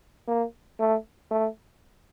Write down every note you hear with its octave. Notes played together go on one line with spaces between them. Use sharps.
A#3
A3
A3